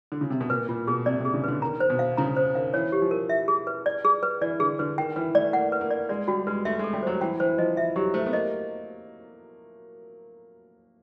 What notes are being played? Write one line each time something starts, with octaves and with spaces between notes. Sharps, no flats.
D3
C#3
C3
B2
A#2 B4
A#2 F4
B2 G#4
C3 D5
C3
G#4
C#3
D3 B4
D#3 A#5
C5
B2
F5
C#3 A#5
C5
D#3 F5
E3 C#5
G4
F3
A#4
E5
G#4
B4
D5
G#4
B4
E3 D5
D3 G#4
D3 B4
D#3 G5
E3 B4
A3 D5
A#3 F#5
B4
A#3
D5
G#3 D5
G3 F#4
G#3 B4
A3 E5
G#3 A4
G3
F#3 C5
E3 G5
E3 C5
F3 D#5
E3 E5
F#3 G4
A3 C5
B3
A#3 D#5